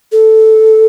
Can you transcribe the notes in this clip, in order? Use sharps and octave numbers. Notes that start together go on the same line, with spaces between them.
A4